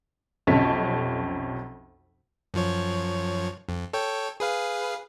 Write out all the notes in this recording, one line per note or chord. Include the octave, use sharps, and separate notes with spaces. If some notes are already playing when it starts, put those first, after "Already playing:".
B1 F2 C3 C#4 A5 B6
F#2 F3 C#5
F2
A4 C#5 G5
G#4 B4 F5